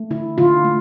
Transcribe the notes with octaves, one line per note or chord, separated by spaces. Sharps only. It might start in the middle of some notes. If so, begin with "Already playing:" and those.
Already playing: A3
D3 E4
D3 F4
A3